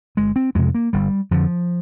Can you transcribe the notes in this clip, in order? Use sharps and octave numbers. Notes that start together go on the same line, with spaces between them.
G1 G#3
C4
F2 C3 G#3
A#3
G1 G3
F2 D3 F3